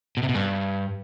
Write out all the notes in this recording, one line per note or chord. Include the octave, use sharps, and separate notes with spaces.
B2
C3
B2
G2